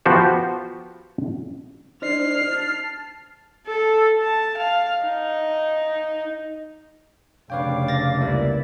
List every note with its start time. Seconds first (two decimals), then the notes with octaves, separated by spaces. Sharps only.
0.06 F3 B3 F#4 G4 C5
2.02 D4 D#4 C5 F6 C7
2.51 A5
3.67 A4
4.21 A5
4.58 F5
5.04 D#4
7.50 F1 C#3 D4 B4 C#5 F5 G5 D6
7.88 A6 A#6
8.20 C#2 G3 A#3 E4 B4 D5